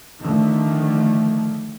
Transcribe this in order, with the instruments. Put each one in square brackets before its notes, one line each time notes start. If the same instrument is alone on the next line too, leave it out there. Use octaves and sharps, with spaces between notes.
[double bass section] D3 D#3 F3 A3